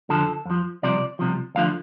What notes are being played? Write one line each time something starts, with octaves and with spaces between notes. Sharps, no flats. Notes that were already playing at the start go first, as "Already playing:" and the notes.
F2 D3 F3 A4
F2
F3
C2 C3 F3 D5
C2 C3 F3
D2 D3 F3 F5